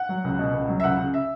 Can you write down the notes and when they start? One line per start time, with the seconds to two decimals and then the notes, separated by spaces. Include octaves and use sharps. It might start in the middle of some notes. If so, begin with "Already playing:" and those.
Already playing: F#5
0.09 F#3
0.24 C#2
0.39 B2
0.54 C#2
0.69 F#3
0.80 E5
0.84 C#2 F#5
0.98 C#3
1.14 E5